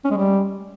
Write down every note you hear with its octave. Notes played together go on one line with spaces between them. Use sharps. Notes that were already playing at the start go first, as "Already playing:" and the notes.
C#4
G#3
G3